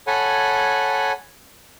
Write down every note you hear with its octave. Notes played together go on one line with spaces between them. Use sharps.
A4 C#5 F#5 G#5 B5